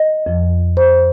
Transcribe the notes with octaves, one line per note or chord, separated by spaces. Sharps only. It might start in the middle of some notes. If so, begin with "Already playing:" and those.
Already playing: D#5
F2 F3
C5